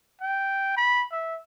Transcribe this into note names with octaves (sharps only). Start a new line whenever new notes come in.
G5
B5
E5